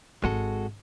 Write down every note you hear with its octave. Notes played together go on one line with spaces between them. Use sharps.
G#1 G#3 F#4 A4